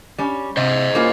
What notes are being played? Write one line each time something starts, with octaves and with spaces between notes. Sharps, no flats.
G3 C#4
C3 C5 D#5
G3 A#3 C#4 F4